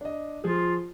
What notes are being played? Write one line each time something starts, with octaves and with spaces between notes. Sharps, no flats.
D4 D#5
F3 F4 G#4